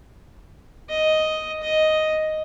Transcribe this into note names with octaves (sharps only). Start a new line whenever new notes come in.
D#5
D#5